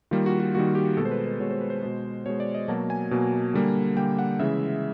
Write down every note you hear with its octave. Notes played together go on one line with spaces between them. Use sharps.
D#3 G3 A#3 F4
F#4
F#4
D#3 G3 A#3 F#4
G4
B2 G#3 A4
C5
B4
B4
B2 G#3 C#5
C5
B4
C5
B2 G#3
B2 G#3 C#5
D5
D#5
B2 F#3 A#3 A5
G#5
B2 F#3 A#3
D3 G3 A#3
D3 G3 A#3 G5
F#5
C#3 E3 G#3 E5